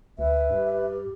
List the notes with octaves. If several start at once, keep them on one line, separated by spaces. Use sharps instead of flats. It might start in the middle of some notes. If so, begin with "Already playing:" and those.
D2 B4 E5
G2 G4